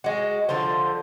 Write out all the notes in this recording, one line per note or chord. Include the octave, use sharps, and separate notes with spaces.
G#3 F#4
D3 F3 A4 C5